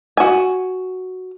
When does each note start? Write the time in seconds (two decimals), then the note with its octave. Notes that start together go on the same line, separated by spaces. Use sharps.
0.17 F#4 G#5